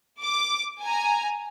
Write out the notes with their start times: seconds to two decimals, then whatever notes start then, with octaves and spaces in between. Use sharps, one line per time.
0.20 D6
0.81 G#5 A#5